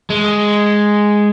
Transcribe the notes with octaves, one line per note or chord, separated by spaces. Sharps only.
G#3